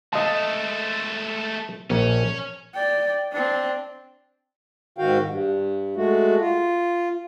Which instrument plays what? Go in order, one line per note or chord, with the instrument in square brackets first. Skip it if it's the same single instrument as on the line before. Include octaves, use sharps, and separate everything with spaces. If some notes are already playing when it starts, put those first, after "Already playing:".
[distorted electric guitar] G#3 A3 [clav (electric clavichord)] D#5 F5 A5
[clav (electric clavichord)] A#1 [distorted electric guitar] C#4
[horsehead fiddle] D5 G5
C4 D4
[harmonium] G#2 D#3 F#4 F5 G5
G2
G#3 A3 F#4
F4